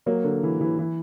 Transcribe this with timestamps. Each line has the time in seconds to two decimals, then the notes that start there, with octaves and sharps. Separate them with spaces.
0.06 F#3 A#3
0.24 D3
0.43 E3
0.61 E3
0.78 E3